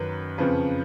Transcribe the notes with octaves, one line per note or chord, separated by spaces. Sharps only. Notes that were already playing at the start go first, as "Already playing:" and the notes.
Already playing: F#2 D#3 B4
F2 C#3 F3 B4